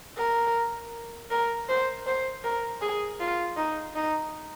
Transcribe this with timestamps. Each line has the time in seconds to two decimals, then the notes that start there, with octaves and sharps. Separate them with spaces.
0.18 A#4
1.30 A#4
1.69 C5
2.07 C5
2.44 A#4
2.81 G#4
3.20 F4
3.57 D#4
3.95 D#4